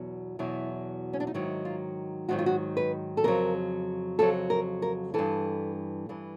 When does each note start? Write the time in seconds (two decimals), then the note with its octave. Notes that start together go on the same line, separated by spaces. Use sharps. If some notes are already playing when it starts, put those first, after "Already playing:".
Already playing: E2 B2 F#3
0.39 E2 B2 F#3 E4
1.13 C#4
1.20 D4
1.27 D#4
1.34 G#2 D#3 F#3 E4
1.65 F4
2.29 G#2 D#3 F#3 F#4
2.39 F4
2.46 F#4
2.77 B4
3.17 A4
3.24 F2 C#3 F#3 A#4
4.19 F2 C#3 F#3 A4
4.50 A#4
4.82 A#4
5.14 G2 E3 A4
6.09 G2 E3